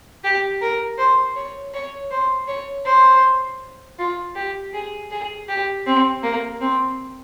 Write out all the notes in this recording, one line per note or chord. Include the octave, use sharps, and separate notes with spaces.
G4
A#4
C5
C#5
C#5
C5
C#5
C5
F4
G4
G#4
G#4
G4
C4
A#3
C4